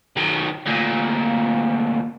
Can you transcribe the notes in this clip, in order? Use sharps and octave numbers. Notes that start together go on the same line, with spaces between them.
D#3 F#3
D2 A#2